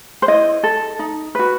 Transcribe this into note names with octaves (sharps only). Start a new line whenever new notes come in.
C5
E4 D#5
A4
D#4
F#4 B4